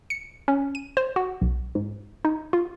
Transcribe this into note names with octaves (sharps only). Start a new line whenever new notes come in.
C#7
C#4
D#7
C5
F#4
B1
G#2
D#4
F4